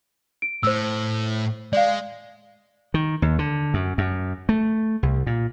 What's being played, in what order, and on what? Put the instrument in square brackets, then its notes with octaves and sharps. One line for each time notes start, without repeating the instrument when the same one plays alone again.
[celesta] D7
[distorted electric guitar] A2 [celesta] C5 E6
[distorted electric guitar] G#3 [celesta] D5 F5
[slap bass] D#3
D#2
D3
F#2
F#2
A3
C2
A#2